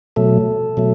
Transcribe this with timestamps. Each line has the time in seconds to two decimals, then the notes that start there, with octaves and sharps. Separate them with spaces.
0.16 B2 F#3 A3 A4
0.77 B2 F#3 A3